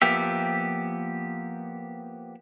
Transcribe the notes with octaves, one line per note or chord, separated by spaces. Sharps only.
F3 A#3 B3 G4 E5